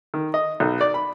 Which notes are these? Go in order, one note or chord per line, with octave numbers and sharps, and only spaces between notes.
D#3
D#5
B1
D5
B5